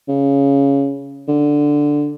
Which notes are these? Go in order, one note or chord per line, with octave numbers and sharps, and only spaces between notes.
C#3
D3